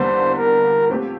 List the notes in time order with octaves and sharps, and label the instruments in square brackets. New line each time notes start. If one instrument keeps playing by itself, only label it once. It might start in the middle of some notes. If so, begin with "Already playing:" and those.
Already playing: [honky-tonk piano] E2 D3 G3 A#3 [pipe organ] C5
[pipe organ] A#4
[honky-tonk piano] A#2 A3 C4 G4